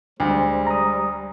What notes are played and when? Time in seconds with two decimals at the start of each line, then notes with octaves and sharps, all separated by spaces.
0.20 D2 G3 G#3 C5
0.67 A#5 D#6